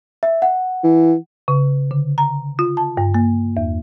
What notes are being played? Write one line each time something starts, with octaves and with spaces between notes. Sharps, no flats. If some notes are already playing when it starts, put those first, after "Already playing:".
E5
F#5
E3
C#3
D3
A#5
F4
A5
G2
A#3
E2